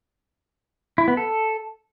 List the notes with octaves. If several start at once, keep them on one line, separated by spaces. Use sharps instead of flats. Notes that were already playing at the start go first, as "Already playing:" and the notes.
E4
B3
A4